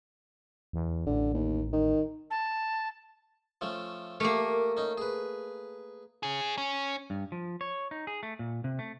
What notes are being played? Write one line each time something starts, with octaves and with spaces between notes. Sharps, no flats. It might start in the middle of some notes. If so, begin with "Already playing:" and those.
E2
A1 D3
D#2
D#3
A5
F3 A3 C#4
A3 A#3 G4 A#4
C#4 D#4
G#4 B4
C#4 G#4
C#4
G2
F3
C#5
D#4
G#4
A3
A#2
C3
A3